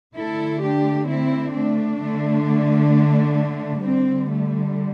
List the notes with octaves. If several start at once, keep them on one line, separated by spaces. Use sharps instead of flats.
D3 A3 E4 A4
D4 G4
C4 E4
A3 D4
D3 A3
D3 G3 C4
A3